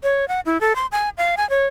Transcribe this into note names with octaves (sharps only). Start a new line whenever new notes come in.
C#5
F#5
E4
A4
C6
G#5
F5
G#5
C#5